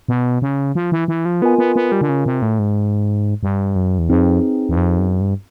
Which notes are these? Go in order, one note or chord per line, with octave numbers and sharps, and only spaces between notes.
B2
C#3
F3
E3
E3
F3
B3 F4 A#4 D#5 G#5
B3
B3
G3
D3
C#3
C3
A2
G#2
G2
F#2
E2
F2 C4 D#4 G#4 B4
E2
F2
F#2
G2